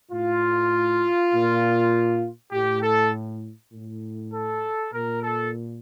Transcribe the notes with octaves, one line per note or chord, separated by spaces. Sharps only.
A2 F4
A#2
A2 G4
A4
A2
A4
A#2 A#4
A4